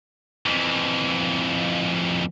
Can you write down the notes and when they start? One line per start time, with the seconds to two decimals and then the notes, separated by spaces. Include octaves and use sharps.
0.46 F2 E3